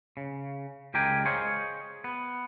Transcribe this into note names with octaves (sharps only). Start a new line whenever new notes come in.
C#3
C#2 G#3 G4 A#4 G5 G#5
G#4 C5 C#5 D#5 F5
B3